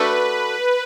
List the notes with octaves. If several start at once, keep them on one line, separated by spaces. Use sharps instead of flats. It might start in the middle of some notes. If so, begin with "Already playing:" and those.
Already playing: A3 D4 F#4 B4